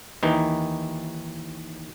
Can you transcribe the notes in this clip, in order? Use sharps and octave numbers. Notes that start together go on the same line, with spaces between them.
D#2 D#3 E3 D#4